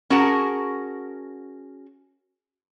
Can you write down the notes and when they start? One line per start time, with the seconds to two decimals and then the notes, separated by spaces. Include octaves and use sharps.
0.10 C#4 F#4 G#4 A#4 F#5 A5